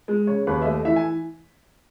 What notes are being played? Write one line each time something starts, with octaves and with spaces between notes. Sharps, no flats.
G#3
C#3 C#5
D#2 B4
E5
A3 D#5
E3 E5
G#5